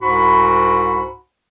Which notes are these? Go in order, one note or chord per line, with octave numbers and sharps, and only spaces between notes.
C2 G#2 F#4 B5